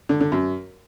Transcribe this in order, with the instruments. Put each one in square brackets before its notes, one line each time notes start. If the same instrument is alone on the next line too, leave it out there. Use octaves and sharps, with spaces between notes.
[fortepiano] D3
D3
F#2